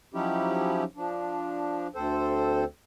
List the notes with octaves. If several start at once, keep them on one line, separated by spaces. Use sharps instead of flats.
F3 F#3 C#4 D#4 E4 G4
F3 D4
D2 C4 A4 C5